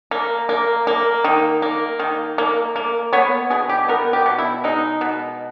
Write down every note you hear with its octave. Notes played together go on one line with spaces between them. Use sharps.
A#3
A#3
A#3
D#3
A#3
D#3
A#3
A#3
B3 C#5
B2 G#4
G4
B3 A#4
G4
B2
E4
G#3 D#4
B2